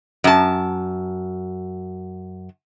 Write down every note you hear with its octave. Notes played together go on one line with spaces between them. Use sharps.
F#2 A5